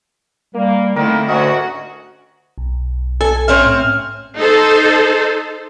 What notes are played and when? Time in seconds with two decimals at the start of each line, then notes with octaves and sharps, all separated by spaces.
0.55 G3 A#3
0.96 D3 D#3 A3 A#3 C4 E4 A#4
1.29 D2 C#4 F#4 D#5 F#5
2.58 B1
3.21 A4 G#5
3.48 C4 C#4 E5 F6
3.66 A2
4.37 D#4 A4 C5